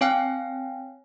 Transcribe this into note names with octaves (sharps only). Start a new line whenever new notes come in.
C4 C#5 F5 G5 G#5 F6